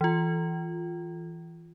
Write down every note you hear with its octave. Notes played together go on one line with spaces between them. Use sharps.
E3 F4